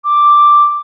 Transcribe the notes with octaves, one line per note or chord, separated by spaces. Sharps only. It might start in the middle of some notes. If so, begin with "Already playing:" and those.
D6